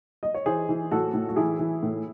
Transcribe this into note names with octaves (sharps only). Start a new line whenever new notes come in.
D#5
C#5
E3 G#4 C5
E3
A2 F#4 A4
A2
F#4
E3 E4 G#4
E3
A2